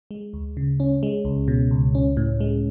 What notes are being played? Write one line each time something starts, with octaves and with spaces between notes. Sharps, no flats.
G#3
D2
C#3
C#4
G#3
C#2
B2
C#2
C#4
A2
G#3